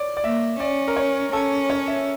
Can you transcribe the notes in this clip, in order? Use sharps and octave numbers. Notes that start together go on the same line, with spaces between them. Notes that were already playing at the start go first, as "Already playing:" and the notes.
Already playing: C#5 D5
D5
A#3 E5
C#4 D5
A#4
C#5
C#4 A4
C#5
E5